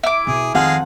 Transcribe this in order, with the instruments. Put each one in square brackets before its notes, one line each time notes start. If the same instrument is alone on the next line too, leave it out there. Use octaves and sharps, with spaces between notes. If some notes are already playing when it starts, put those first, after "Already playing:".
[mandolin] E4 D6
[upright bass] B2 [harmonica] G#4
[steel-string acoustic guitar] F2 F#5 [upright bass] D#3 [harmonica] G#3 G#4 F5